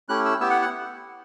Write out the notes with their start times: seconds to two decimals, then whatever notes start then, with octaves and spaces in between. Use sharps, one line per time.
0.09 A3 C#4 E4 G4 F#6
0.25 E6
0.40 B3 E4 G4 E6
0.50 F#5
0.62 F#5